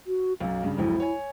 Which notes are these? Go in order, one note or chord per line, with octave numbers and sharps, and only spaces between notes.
F#4
B1 F#2 F5
G2 C#3
B1 F2 G#2 E4
C#5 G#5